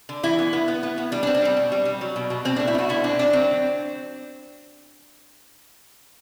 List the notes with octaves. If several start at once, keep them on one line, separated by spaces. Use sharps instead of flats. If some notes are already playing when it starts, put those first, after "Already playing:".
D3
E3 E4
B3
B3
B3
B3
B3
G3 D4
D4
C4
D4
G3 C4
B2
G3
G3
F#3
B2
B2
B2 C4
A3 D4
E4
B2 F#4
D3 E4
C4 D4
C4 D4
F#3 C4